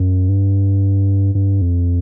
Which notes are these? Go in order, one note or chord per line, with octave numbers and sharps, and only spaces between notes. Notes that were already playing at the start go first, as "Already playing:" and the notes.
Already playing: F#2
G2
G2
F2